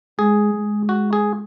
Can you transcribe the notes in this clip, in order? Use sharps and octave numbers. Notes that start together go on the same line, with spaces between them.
G#3 G#4
G#3
F#4
G#4